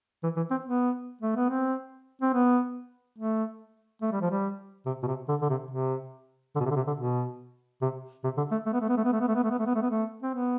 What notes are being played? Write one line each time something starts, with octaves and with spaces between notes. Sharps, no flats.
E3
E3
C4
B3
A3
B3
C4
C4
B3
A3
A3
G3
F3
G3
C3
B2
C3
D3
D3
C3
C3
D3
B2
C3
D3
C3
D3
B2
C3
C3
D3
A3
A3
B3
A3
B3
A3
B3
A3
B3
A3
B3
A3
B3
A3
B3
A3
B3
A3
C4
B3